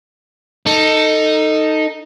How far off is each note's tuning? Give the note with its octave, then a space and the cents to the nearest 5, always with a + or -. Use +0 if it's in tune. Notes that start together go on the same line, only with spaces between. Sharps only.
D#4 +0 A4 +20